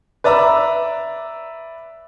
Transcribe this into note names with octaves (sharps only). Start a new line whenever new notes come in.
B4 D5 E5 A#5 D6 E6